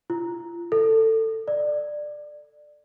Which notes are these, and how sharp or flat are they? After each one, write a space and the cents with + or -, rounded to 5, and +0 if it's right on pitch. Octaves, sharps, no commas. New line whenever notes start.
F4 -35
A4 +20
D5 +15